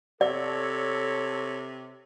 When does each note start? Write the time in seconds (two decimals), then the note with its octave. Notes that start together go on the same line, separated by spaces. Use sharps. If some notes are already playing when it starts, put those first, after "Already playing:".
0.21 C3 A4 C#5 D5